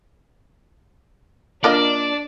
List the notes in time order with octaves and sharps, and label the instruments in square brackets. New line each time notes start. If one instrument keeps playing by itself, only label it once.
[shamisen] A#3 F4 D#5 [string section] D4 [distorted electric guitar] D5